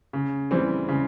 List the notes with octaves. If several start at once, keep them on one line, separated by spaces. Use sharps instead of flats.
C#3
E3 G3 C4
C#3